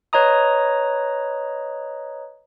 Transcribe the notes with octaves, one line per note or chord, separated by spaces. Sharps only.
B4 C#5 D#5 A#5 D#6